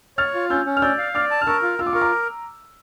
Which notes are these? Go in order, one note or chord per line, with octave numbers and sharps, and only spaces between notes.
C#5 F6 A6
F4
C#4 E6 G6
C#4
F6
D5 E6 G6
F5
D5 D6 F6
A5
F6
A#4 C#6 E6
F4
F4 E6
D6
A#4 C#6
A#5 D6